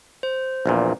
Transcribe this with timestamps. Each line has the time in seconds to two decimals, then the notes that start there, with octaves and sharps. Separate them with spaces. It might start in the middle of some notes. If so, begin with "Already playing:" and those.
0.23 C5
0.66 A#1 E2 A#2